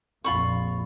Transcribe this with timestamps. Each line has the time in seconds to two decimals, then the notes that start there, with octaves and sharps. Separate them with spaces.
0.24 A#1 F2 F4 B5 C#6